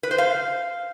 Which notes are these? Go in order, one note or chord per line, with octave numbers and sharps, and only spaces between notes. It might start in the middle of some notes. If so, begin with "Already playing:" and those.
B4
C5
F5